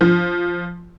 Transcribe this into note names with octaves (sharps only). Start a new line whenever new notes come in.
F3